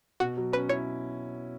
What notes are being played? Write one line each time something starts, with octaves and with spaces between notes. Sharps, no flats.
B2 F#4
F#3
C#4 B4
E4 C#5